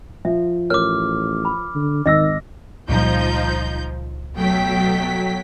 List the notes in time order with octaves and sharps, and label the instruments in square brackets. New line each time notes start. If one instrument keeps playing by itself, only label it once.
[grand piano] F3 [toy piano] E5
[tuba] A1 [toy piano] A#4 C#5 [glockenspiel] D6 F6
[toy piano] B5
[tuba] D3
[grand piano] G#1 A#6 [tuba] D#3 [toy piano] D#5 E6
[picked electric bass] C#2 A#2 G3 [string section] F3 D#4 G6
[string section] B2 A3 G5 [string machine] F#3 B6